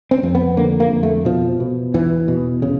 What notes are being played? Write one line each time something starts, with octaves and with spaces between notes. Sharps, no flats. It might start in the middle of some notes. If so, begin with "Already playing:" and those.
C4
F2
B3
D3 A#3
A#3
F2
A3
B2 F3
B2
E2 E3
B2
C#3